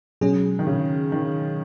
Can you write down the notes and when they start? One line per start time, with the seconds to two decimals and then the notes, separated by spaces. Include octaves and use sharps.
0.21 B2 F#3 G#3 C#4 G#4
0.59 D#3
0.67 C#3
1.12 D#3